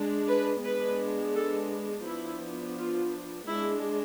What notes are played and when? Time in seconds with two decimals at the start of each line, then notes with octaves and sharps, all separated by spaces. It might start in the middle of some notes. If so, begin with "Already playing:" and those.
Already playing: G#3 D4
0.28 B4
0.63 G#3 B3 D4 B4
1.35 A4
2.05 F3 B3 D4 E4
2.77 F4
3.47 G#3 D4 E4